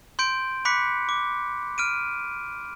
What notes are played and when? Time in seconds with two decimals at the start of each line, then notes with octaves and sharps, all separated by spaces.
0.19 C6 G6 D7
0.65 B5 D6 F#6 B6 C#7
1.09 D6
1.78 F6 D7 D#7